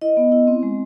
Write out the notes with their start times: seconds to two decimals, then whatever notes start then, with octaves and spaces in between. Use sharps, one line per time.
0.01 E4 D#5
0.17 B3
0.32 E4
0.47 C4
0.63 G#3